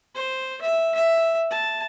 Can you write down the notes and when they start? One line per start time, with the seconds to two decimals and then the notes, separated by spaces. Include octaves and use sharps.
0.15 C5
0.61 E5
0.94 E5
1.51 A5